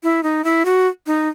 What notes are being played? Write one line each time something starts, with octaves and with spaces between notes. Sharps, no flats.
E4
D#4
E4
F#4
D#4